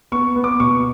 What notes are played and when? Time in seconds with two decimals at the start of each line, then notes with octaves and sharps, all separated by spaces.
0.12 B3 C#6
0.36 B3
0.44 D6
0.60 B2 C#6